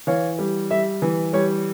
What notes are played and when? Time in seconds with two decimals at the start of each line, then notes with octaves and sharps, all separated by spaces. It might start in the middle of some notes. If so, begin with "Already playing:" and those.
0.07 E3 C#5 F5
0.39 G3
0.71 G3 E5
1.02 E3
1.33 G3 C#5